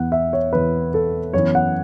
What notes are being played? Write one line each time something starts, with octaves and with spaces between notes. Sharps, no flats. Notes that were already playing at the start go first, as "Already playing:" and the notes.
Already playing: E2 E3 B3 F#5
E5
C#5
E2 E3 B3 B4
A4
F#2 E3 B3 C#5
F#5